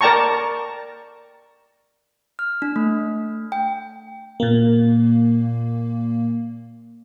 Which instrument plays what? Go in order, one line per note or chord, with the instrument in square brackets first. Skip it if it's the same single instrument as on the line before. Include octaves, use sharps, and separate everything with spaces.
[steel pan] A#4 D5 G5 A5 A#5 C#6
[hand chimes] F6
D4
A3
G5
[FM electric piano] A#2 A#3